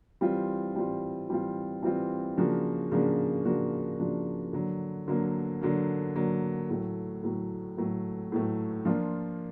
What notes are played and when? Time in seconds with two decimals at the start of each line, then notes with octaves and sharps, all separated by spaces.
0.21 E3 G3 C4 F4
0.75 E3 G3 C4 F4
1.29 E3 G3 C4 F4
1.82 E3 G3 C4 F4
2.37 C#3 F3 A#3 D4 F#4
2.92 C#3 F3 A#3 D4 F#4
3.45 C#3 F3 A#3 D4 F#4
3.99 C#3 F3 A#3 D4 F#4
4.53 D3 F#3 A#3
5.08 D3 F#3 A#3
5.62 D3 F#3 A#3
6.16 D3 F#3 A#3
6.69 A2 F#3 A3
7.23 A2 F#3 A3
7.78 A2 F#3 A3
8.32 A2 F#3 A3
8.85 F3 A#3 D4 F4